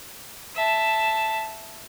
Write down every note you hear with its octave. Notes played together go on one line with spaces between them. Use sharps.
E5 A5